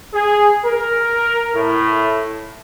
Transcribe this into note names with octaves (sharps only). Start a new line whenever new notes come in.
G#4
A#4
A2